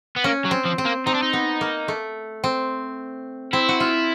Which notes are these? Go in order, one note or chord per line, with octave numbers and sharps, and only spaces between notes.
B3
A#3 C#4
F#3
C4
F3
C4
A#3
C4 D#4
D4
D#4
B3
A#3
A3
C4
C4 E4
F#4
F4